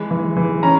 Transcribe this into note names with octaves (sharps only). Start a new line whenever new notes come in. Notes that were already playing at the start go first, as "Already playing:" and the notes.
Already playing: E3 G#3
E3
E3
C#4 A#5